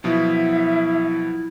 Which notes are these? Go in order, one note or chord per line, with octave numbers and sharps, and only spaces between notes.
B2 F3 F#3 E4 E5